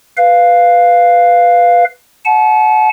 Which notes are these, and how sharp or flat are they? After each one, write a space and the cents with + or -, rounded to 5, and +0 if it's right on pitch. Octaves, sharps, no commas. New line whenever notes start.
B4 +0 F5 +0
F#5 -15 A5 -35